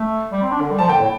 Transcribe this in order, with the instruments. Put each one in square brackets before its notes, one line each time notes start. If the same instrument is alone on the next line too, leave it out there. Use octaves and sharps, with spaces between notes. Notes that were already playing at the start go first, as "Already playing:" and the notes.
Already playing: [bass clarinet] A3
G3
C4
D4
D3
G3
[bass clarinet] F3 [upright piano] A5
[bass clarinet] D3 [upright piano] G5
[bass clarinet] A2